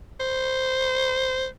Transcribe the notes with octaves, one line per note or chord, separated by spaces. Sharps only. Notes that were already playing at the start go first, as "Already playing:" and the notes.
C5